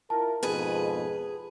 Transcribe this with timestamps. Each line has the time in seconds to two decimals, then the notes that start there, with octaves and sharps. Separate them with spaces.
0.10 E4 F4 A#4 A5
0.43 F2 G#2 B2 G#4 B4